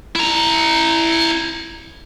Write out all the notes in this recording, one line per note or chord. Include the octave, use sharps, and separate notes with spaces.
E4 A#5